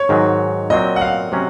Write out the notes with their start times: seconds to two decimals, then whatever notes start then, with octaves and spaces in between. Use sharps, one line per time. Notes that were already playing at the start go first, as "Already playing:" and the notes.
Already playing: C#5
0.09 G#2 D#3 F#3
0.70 A#2 F#3 C4 D#5
0.96 F#5
1.01 F5
1.32 C3 F#3 C#4